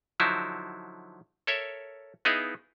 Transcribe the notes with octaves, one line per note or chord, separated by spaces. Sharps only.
D3 F3 F#3 D#4 E4
A4 A#4 C#5 E5
B3 D#4 E4 G#4 D#5 F5